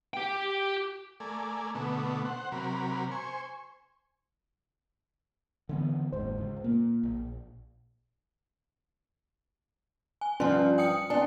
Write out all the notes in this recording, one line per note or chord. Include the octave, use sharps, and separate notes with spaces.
G4 G5
A3 A#4 D5 G#5
B2 D3 A3 B3
C5 F#5
C3 F#3 A#4 B5
C5 G#5 C#6
D3 E3 B3
F#1 D#2 G#2 C5
C#2
A#2 A#3
A#1
G#5
G2 F3 C#4
G5 D#6 C#7
C#4 D4 G#5